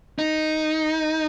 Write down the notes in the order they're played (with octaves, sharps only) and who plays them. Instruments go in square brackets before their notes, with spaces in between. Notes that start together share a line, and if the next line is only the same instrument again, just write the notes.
[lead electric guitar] D#4